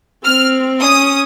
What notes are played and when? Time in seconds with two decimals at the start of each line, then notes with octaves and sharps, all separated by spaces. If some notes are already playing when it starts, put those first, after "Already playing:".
0.25 C4 F6
0.82 C#4 D#6